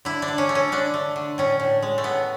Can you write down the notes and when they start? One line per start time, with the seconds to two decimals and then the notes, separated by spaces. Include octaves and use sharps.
0.05 D3 E4
0.22 D4
0.28 D3
0.38 C#4
0.49 A3
0.55 C#4
0.72 D3 D4
0.94 A3
1.16 D3
1.38 A2 C#4
1.60 A2
1.82 G#3
1.98 A3
2.04 A2 B3